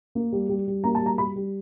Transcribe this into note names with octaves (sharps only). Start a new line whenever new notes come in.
A#3
G3
G3
G3
A#3 A#5
A5
G3
A#5
G3 B5
G3